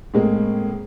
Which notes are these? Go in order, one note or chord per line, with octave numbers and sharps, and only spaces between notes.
A2 G#3 A#3 C4